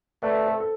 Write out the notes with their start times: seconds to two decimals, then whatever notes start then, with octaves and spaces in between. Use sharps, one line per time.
0.22 A3 B4 D5
0.46 A4 C5
0.60 A4